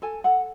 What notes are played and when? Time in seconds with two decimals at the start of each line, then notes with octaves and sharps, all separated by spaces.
0.02 A4 G#5
0.24 A4 F#5